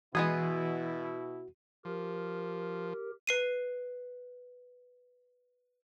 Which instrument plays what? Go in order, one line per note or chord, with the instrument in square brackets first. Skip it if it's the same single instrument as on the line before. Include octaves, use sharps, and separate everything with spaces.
[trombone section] B2 E4 [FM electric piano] E3 [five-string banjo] G#3 B3 G#4 [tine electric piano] F#4
[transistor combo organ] F3 [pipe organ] G4 A#4
[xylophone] B4 C7 D#7